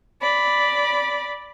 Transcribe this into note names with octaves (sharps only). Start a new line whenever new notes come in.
D5 B5